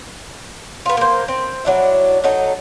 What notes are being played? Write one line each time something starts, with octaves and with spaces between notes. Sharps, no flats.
B3 F4
A#3 C5
C4
F#3 D4 E4
F#3 D#4 A4